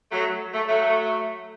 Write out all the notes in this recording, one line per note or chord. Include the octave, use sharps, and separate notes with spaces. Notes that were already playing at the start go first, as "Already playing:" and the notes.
F#3 A3
A3
F#3 A3